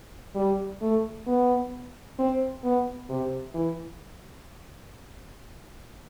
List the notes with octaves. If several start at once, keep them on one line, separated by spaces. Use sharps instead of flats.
G3
A3
B3
C4
B3
C3
E3